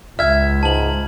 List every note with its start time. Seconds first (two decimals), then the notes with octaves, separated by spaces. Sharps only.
0.19 C#2 E5 F6 G#6
0.63 G#2 A5 F#7